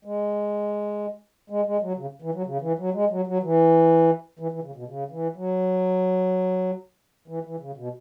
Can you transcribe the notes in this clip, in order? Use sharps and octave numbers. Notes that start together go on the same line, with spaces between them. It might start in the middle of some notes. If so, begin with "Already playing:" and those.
G#3
G#3
G#3
F#3
C#3
E3
F#3
C#3
E3
F#3
G#3
F#3
F#3
E3
E3
E3
C#3
B2
C#3
E3
F#3
E3
E3
C#3
B2